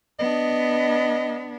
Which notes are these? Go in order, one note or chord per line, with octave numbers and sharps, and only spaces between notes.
B3 D4 D#5